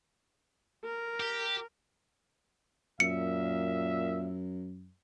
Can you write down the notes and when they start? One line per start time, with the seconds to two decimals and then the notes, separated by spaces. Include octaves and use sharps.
0.85 A#4
1.20 G4
3.00 F#2 A#2 E5 C#7